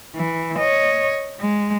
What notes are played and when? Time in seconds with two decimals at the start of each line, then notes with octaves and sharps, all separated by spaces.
0.15 E3
0.58 C#5 D#5
1.40 G#3